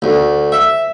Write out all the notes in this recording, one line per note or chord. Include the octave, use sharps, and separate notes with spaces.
D2
E5